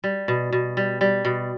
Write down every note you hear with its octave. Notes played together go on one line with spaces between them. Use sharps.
G3
B2
B2
G3
G3
B2